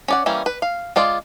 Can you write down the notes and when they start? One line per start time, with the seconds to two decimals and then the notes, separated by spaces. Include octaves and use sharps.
0.08 C#4 D5 F#5
0.26 E3 G3 A#3 C#4
0.46 B4
0.62 F5
0.96 G#3 F4 D5